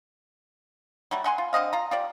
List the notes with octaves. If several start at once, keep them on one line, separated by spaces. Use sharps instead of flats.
F#3 G3 A3 F#4
A3 F#5 G#5 C6
F4
D3 C4 D#5 F5
F4 A#5
F4 G4 D5